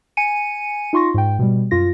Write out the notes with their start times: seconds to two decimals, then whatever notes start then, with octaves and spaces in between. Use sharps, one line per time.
0.17 G#5 C#7 D#7
0.93 D#4 F4 C6 C#6 A#6
1.14 G#2 G5
1.39 B2 G3
1.71 F#2 F4 A#6